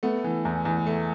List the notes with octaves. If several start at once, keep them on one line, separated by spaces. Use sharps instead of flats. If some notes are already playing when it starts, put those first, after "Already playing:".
A3 B3
E3
E2
E2
A3